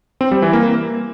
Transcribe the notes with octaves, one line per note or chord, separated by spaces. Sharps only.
C4
G3
E3
A#3